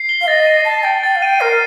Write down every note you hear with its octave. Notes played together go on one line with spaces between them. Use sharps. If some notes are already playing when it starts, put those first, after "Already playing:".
Already playing: C7
G7
F5
D#5 A6
D#7
A5 C7
G5 A6
G5 A6
F5
G5 D#7
A#4 C7